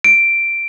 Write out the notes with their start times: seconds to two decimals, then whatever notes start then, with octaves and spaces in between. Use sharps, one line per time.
0.04 D7